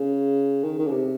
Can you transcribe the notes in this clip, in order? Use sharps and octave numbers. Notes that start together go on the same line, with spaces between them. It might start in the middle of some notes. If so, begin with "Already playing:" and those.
Already playing: C#3
D#3
D#3
C#3
C3